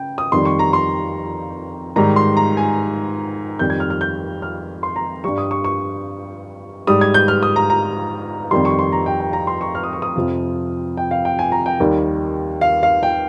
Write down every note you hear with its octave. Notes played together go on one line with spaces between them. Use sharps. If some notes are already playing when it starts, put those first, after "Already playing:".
Already playing: C#3 G5
D#6
F2 D#3 G3 C6
C#6
A#5
C6
G#2 D#3 G3 A#5
C6
A#5
G#5
F2 D#3 G3 G6
G#6
F6
F6
G6
F6
C6
A#5
G2 G3 C#6
D#6
C#6
C#6
G#2 G3 D#6
G#6
G6
F6
D#6
A#5
A#5
F2 D#3 G3 C6
C#6
C6
A#5
G5
G5
A#5
C6
C#6
F6
D#6
C#6
D#6
F2 C3 F3
G5
F5
G5
G#5
A#5
G5
D#2 D#3 G3
F5
F5
G5